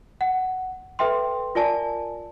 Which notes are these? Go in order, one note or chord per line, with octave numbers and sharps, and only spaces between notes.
F#5
A4 B4 E5 G5 C6
F4 A#4 D5 G#5 A5